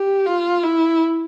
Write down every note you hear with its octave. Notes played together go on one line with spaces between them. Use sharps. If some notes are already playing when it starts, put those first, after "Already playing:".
Already playing: G4
F4
E4